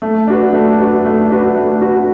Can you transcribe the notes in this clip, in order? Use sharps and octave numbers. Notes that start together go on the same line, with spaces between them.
A3
D4 F#4 B4
A3
D4 F#4 B4
A3
D4 F#4 B4
A3
D4 F#4 B4